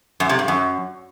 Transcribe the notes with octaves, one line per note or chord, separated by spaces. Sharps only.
F#2
C3
G2
F#2